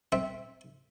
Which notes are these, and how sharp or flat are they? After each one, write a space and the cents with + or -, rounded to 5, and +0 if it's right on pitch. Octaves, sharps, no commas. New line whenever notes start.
C4 +0 E5 -10